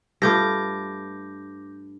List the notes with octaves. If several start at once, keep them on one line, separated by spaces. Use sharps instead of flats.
G2 A3 F4 D6 G6 A#6